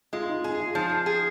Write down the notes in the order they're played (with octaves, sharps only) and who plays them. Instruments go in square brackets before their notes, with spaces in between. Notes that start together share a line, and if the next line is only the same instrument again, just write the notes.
[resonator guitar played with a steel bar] G#3 [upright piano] F4
[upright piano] D#4
[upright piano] D#4 [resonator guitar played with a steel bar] G#4
[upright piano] F4
[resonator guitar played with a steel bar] F3 [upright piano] D#4
[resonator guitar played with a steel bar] G#4